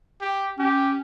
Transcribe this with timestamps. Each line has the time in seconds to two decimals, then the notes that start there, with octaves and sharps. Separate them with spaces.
0.21 G4
0.59 C#4 G4